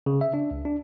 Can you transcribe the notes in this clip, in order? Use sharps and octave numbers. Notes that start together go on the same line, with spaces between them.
C#3
E5
D4
C#2
D4